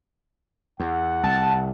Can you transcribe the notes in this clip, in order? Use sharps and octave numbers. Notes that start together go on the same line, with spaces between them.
E2 F#5
C2 A5